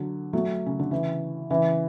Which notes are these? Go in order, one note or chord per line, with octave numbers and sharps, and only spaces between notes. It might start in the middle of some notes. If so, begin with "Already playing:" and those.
Already playing: D3 F#3
F#3 A3
C#3
D3
C#3 E3
C#3 E3